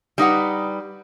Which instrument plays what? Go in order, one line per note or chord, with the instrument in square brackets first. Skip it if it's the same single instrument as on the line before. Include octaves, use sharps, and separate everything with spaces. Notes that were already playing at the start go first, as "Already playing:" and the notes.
[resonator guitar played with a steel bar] G3 D#4 B4 F#5